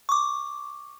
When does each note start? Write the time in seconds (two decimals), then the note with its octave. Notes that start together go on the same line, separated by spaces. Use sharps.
0.09 C#6 D6